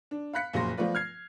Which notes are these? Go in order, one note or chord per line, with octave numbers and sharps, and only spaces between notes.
D4
F5 B5 F#6 B6 C#7
F#1 A#2 F3 F#3 C6 A#6
F3 A3 B3 F4 B4 D5
F6 G#6 C7